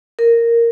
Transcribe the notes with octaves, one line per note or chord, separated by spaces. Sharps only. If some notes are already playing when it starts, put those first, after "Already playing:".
A#4